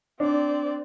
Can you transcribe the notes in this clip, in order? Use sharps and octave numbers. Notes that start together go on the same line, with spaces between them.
C4 D4 D5